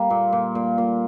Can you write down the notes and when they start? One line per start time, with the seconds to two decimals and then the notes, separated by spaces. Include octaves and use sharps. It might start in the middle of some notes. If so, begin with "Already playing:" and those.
Already playing: G3 A#3
0.10 A#2
0.33 A#2
0.55 A#2
0.78 A#2